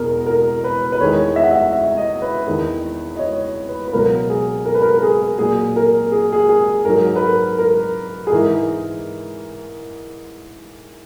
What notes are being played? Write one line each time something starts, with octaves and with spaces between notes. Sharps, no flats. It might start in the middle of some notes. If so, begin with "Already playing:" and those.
Already playing: E2 B2 G#3 A#4
A#4
B4
B4
E2 D#3 G#3 C#5
E5
F#5
E5
E5
D#5
B4
E2 D#3 G#3
D#5
C#5
B4
B4
C#2 B2 F#3 A#4
G#4
A#4
B4
A#4
A#4
G#4
A#2 F#3 G#4
A#4
G#4
G#4
G#4
G#2 F#3 A#4
B4
A#4
A#4
G#4
G#2 E3 G#3 A#4